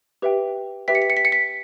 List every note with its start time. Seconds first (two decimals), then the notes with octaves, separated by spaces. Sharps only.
0.22 G4 B4 E5 G5
0.88 G4 B4 E5 G5 B6
0.95 C#7
1.02 B6
1.10 C#7
1.17 B6
1.25 C#7
1.32 B6